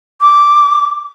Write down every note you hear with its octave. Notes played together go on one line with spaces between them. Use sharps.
D6